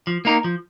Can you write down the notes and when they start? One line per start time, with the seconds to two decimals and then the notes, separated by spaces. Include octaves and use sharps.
0.07 F3
0.25 A#3 D#4 A#4
0.44 F3